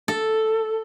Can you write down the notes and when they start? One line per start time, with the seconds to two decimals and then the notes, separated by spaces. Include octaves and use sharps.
0.08 A4